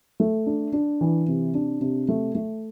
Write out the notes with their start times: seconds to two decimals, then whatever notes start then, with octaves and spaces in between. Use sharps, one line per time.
0.20 A3
0.47 D4
0.73 D4
1.01 E3
1.28 C3
1.55 D4
1.81 C3
2.08 A3
2.35 A3